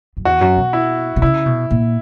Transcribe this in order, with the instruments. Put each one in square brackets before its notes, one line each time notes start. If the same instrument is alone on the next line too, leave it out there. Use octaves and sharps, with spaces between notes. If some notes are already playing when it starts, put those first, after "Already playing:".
[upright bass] F#2
[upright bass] E2 [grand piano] F#4
[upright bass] F#2
B2
[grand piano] E4
[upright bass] B2
[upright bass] C#3 [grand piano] E4
[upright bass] B2
A#2